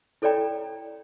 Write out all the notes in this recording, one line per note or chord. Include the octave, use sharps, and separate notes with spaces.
E4 A4 C#5 D5 G5 A#5